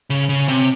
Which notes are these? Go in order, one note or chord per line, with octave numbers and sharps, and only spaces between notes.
C#3
C#3
C3